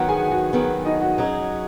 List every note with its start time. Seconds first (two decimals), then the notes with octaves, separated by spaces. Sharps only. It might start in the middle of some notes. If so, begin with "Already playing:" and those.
Already playing: D#3 F#3 B3 F#4 F#5
0.09 G#4 G#5
0.31 F#4 F#5
0.53 D#3 F#3 B3 G#4
0.85 D#4 D#5
1.01 F#4 F#5
1.18 F#3 C#4 D#4 G#4 C#5